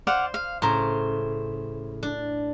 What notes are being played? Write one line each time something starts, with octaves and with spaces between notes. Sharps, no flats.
C5 D5 F5 F#5
F5
A2 C#3 C5 A#5
D4